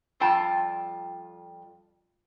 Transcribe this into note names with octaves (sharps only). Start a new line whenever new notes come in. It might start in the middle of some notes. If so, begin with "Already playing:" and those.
F2 G3 F4 G5 A5